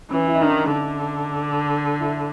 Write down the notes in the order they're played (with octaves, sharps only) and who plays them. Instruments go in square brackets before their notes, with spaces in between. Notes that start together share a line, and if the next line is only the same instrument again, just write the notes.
[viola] E3 [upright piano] C#4
[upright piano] E4
D#4
[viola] D#3 [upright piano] D4
[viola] D3
[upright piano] E4